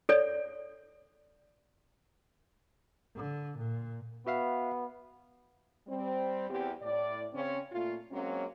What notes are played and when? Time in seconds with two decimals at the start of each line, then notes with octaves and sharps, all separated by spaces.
0.09 A4 C#5 D5
3.15 D3
3.57 A#2
4.27 B3 F#4 E5 F5
5.87 G3 C4
6.49 E2 C4 G4
6.81 A2 D5
7.33 C#3 C4 C#4
7.72 A#2 A3 F4
8.11 F#3 G#3 A#3 C4 C#4